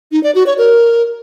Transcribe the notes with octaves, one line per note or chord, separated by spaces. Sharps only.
D#4
D5
F#4
C#5
A#4